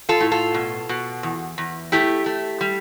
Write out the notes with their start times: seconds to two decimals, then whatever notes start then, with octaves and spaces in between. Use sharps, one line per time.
0.09 F4 A4
0.20 A2
0.31 F4 A4
0.54 B2
0.89 B2
1.23 E2
1.58 E2
1.92 A3 E4 G4
2.26 A3
2.61 G3